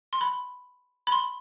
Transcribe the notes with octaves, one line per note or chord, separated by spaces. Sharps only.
C6
B5
B5
C6